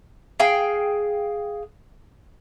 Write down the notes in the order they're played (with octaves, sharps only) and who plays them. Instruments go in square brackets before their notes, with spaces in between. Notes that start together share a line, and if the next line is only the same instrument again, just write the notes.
[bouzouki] G#4 F5 G5